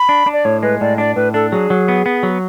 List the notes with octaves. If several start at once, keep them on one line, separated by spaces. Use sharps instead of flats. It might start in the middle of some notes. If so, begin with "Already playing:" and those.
Already playing: B5
D4
D4
D5
A2 C#5
G#3 B4
A2 D5
D4 D5
A2 B4
D4 A4
F#3 G#4
F#3
B3
B3
F#3